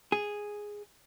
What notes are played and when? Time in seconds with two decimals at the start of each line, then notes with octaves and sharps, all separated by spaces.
0.12 G#4